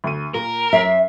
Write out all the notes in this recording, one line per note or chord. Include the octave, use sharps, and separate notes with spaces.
D2 D#7
A#2 A#4
F#2 C#4 E5 C7